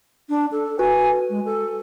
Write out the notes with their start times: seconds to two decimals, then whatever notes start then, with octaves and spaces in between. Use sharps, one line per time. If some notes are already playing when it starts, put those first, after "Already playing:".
0.29 D4
0.52 A4
0.79 F#4 B4 G#5
1.30 G#3
1.45 A4